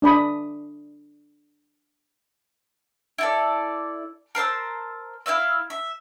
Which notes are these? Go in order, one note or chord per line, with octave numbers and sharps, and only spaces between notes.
D4 D5 B5 D#6
E4 A4 D5
A#4 C5 A5 E6
E4 E5 F5 E6
E5